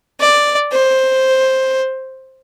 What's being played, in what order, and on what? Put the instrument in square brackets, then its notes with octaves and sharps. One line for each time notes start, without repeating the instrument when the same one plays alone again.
[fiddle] D5
C5